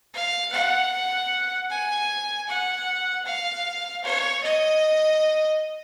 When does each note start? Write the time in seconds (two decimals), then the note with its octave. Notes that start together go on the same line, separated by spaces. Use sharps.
0.14 F5
0.52 F#5
1.70 G#5
2.49 F#5
3.25 F5
4.04 C#5
4.43 D#5